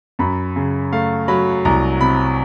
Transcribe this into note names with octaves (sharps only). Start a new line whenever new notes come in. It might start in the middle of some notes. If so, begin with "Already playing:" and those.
F#2 B5
C#3
A3 F5
F#3 B5
C2 A#5
C3 B5